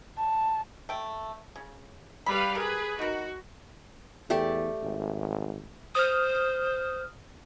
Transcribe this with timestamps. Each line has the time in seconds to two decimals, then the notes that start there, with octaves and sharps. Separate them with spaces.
0.17 A5
0.89 A3 G5
1.56 C#3
2.26 G3 B4 F5 B5
2.55 G#4 A#4 B4
2.99 D#4 F#4 A#4
4.30 E2 A3 G4 D5
4.81 G#1
5.95 C5 D#6 F6